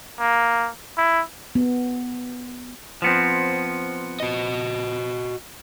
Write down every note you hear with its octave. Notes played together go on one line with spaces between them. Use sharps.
A#3
E4
B3
F3 B3 C4
F#4 D#5